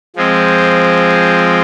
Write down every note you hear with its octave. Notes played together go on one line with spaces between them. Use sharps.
F3 G#3 C4